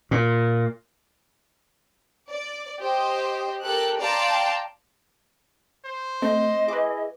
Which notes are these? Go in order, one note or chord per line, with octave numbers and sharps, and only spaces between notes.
A#2
D5
G4 C5 D#5
G4 A4 A#4 F#6
D5 F5 G5 A5 A#5 C6
C5
A3 C4 D#5
E4 G#4 B4 D6